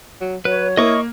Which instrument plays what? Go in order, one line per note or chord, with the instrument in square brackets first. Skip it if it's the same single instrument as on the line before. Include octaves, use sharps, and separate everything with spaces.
[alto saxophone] F#3
[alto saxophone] F#3 [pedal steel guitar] B4 [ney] C#5
[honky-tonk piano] A#3 [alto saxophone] E4 [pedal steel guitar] D#5 C#6 D#6